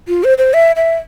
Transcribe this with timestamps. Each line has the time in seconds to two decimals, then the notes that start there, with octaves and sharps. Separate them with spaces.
0.08 F4
0.24 C5
0.38 C5
0.54 E5
0.76 E5